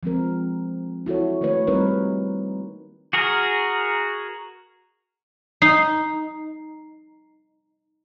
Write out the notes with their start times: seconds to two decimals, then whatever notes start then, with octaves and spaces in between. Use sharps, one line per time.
0.03 F3 G#3 C4 A#4
1.06 E4 F#4 A4 C#5
1.41 D#3 A3 A#3 B4 C#5
1.67 G3 A#3 C4 D#4 A#4 B4
3.13 F#4 G#4 A#4
5.62 D#4 C7